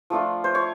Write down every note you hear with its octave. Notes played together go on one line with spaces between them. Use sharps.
F3 A3 D4 F4
C5
C#5